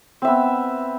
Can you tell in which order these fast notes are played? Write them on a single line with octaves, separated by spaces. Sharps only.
C4 E5 B3